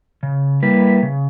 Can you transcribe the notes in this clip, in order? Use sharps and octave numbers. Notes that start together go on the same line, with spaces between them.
C#3
G3 A#3 E4 B4
C#3